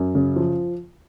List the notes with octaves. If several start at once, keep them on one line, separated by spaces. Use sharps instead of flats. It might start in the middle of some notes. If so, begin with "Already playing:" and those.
Already playing: F#2
C#3
F3